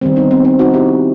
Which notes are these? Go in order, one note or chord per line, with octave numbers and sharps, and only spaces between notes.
D#3 G3 B3 C4
B3 D#4
C4
C4
D#4 F#4
E4 G4